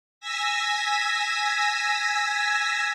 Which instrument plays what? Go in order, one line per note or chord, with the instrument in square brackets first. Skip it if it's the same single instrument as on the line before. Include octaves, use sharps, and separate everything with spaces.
[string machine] G#5 E6 G#6 A#6 B6